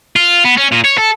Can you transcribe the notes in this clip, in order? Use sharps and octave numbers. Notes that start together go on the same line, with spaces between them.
F4
B3
C#4
A#2
C#5
A4